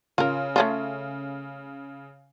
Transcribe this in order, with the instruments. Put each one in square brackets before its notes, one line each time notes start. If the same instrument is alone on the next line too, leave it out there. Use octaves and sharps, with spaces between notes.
[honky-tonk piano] C#3 [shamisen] F4 A#4
[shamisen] A3 C#4 F4